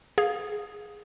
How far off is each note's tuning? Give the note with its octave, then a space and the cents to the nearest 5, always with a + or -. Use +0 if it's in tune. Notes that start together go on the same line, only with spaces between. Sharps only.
G#4 +0 F5 +25